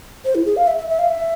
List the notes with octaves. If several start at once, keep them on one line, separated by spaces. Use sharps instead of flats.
C5
E4
G#4
F5
E5
E5
E5
F5
E5